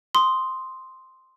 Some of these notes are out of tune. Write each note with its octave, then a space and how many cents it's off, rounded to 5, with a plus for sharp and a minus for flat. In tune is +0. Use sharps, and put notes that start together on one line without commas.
C6 +0 D#6 +0